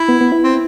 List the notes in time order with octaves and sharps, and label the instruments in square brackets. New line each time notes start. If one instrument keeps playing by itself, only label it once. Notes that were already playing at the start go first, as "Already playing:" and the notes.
Already playing: [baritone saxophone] E4
[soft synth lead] B3
B3
E4
[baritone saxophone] C4